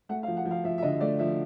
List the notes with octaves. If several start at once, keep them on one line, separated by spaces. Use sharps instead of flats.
A3 F#5
F5
F3
F#5
F3
F5
F3 E5
E5
D3 D#5
A3 D5
F3 E5